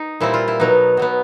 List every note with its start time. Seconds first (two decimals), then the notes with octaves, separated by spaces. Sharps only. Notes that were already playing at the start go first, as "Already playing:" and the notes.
Already playing: D#4
0.20 A#2 G3 C4 E4
0.34 F4
0.48 E4
0.60 B2 F#3 B3 D#4
0.97 B2 F#3 B3